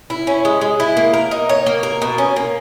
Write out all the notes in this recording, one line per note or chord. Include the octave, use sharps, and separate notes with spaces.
E4
C#4
G#3
G#3
E4
A#3
A#4
D#4
C#5
A#3
A#4
B2
C#4
A#3